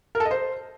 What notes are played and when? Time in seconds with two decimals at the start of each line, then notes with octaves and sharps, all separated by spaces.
0.15 A#4
0.20 A4
0.25 D#5
0.31 C5